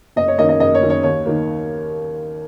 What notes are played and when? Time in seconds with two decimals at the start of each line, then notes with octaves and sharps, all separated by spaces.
0.16 F#1 D#5
0.28 C#5
0.38 F#2 D#3 A#3 D#5
0.49 D#5
0.60 F#1 D#5
0.75 C#5
0.82 F#2 D#3 A#3
0.90 C#5
1.03 D#2 C#5
1.26 D#3 A#3